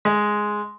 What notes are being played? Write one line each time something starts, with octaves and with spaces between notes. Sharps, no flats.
G#3